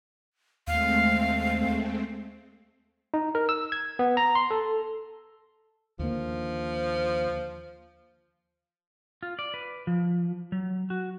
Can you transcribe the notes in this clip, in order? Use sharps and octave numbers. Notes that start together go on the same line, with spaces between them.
D#2 G#3 A3 C4 F5
D#4
A#4
E6
G#6
B3
A#5
C6
A4
D#2 D3 F3 A#3
F4
D5
B4
F3
F#3
F#4